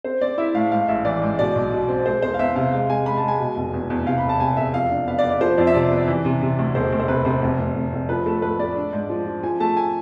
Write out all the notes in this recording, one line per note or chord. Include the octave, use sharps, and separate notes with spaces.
C4 C5
C4 D5
E4 E5
A2 F5
G#2 F5
A1 E5
E3 D5
G#2
B2 D5
B1
B2
C4
G#3 C5
E2 C5
F5
E2 E5
C3 F5
G#3 F5
G#3 G#5
G#3 B5
A5
G#3
G#5
B2
F1
E2
E2
C3 F5
B5
E1
A5
C3 G#5
E1 E5
F2 F5
D4
B3 F5
D5
B3
D5
F3 C5
F2 D5
E5
C3 D5
B3
D5
E3
C3
C3
D2
E1 C5
D2
C5
C3 B4
C3 C5
F1
F1
F1
F1
F3 B4
A3 A4
A2 B4
A3 D5
D4
G#2
F3
F3
F3 G#5
A3 A5
G#5